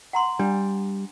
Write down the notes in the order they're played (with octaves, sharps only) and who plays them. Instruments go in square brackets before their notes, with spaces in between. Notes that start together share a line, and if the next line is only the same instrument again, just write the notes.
[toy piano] F#5 A#5 C6
[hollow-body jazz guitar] G3 [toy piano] D4